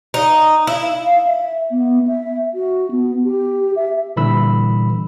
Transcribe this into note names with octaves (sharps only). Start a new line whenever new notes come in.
D#4
E4
F5
E5
B3
E5
F#4
B3
G4
E5
A#2 D3 E3 G3 B5 E6